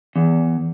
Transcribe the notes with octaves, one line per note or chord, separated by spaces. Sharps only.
E2